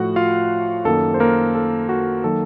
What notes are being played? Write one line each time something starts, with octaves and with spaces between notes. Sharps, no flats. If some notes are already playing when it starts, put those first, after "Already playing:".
Already playing: A2 F3 A3 F#4 F#5
F4 F5
F#2 D#3 A#3 A4
C5
A#3 A#4
A4
F#4
D#3 F#3 A#3 A4